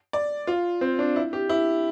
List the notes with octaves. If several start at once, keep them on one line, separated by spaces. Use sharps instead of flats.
D5
F4
C4
D4
E4
G4
E4